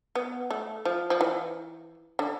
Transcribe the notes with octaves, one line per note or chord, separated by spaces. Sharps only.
B3
A3
F3
F3
E3
D3